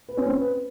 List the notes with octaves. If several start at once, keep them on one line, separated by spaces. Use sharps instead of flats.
B4
C#4
C4
B4